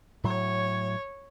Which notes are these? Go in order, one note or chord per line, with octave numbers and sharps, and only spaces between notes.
A2 F#3 C#5